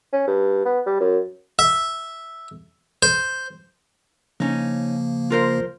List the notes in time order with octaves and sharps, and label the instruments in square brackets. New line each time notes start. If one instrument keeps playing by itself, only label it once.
[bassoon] C#4
G2
B3
G3
F#2
[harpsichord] E5
C5
[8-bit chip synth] C#3 F3 A#3 [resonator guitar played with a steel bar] C#4 D#4
[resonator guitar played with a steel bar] F4 A#4 C5